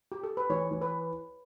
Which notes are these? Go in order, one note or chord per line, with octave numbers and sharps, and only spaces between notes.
G4
A4
B4
E3 C#5
E3
B4